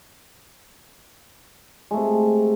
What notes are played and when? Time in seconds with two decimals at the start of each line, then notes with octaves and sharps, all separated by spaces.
1.91 G#3
1.94 A3
1.97 C3